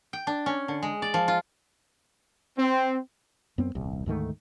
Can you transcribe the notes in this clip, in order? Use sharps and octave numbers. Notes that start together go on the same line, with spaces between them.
G5
D4
C#4
D3
G#3
D5
F3
F4
C4
F#2 B3 C4
D#1 C2
D2 G#2 D#3 A3